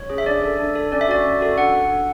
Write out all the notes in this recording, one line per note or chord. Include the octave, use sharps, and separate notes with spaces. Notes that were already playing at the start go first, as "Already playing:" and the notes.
Already playing: C#5
C#4 G#4
E5
D4 D5
A4
D4
A4
C#4 D5
E5
F#4 A4 D5
C#4
F#4 A4
D4 F#5
A4
D4